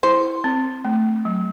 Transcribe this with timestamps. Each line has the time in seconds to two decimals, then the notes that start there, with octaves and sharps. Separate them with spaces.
0.03 E4 C5
0.44 C4
0.85 A3
1.25 F#3